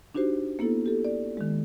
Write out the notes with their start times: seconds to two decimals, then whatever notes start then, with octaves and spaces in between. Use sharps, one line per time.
0.14 D4 D#4 F#4 G4 C5
0.59 A#3 B3 E4 A4
0.86 G4 A4
1.05 D5
1.37 D#3 G#3